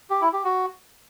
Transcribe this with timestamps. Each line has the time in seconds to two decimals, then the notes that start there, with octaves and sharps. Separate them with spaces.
0.10 G4
0.21 E4
0.33 G4
0.44 F#4